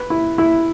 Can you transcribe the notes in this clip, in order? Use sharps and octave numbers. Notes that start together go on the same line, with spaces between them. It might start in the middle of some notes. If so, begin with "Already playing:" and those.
Already playing: B4
E4
E4